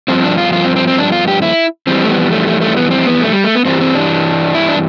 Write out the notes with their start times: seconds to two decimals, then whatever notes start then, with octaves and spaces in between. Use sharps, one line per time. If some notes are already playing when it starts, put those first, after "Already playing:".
0.08 G2 F3 C4
0.24 D4
0.38 F4
0.53 F4
0.64 C4
0.76 C4
0.87 C4
0.98 D4
1.12 F4
1.28 G4
1.42 E4
1.87 F2 E3 G3 C4
2.04 A3
2.09 B3
2.32 A3
2.47 A3
2.61 A3
2.77 B3
2.91 C4
3.06 B3
3.21 A3
3.32 G3
3.44 A3
3.55 B3
3.65 G2 E3 G3 C4
3.81 C4
3.95 D4
4.55 E4
4.69 D4